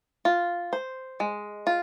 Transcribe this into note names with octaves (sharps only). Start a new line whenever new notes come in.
F4
C5
G#3
F4